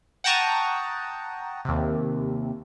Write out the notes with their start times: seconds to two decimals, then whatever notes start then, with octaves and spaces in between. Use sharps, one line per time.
0.24 F#5 G5 A5 A#5 C#6 D#6
1.65 D#2 C3